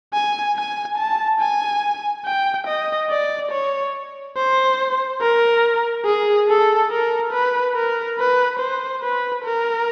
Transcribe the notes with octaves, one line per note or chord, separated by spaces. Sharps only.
G#5
G#5
A5
G#5
G5
D#5
D5
C#5
C5
A#4
G#4
A4
A#4
B4
A#4
B4
C5
B4
A#4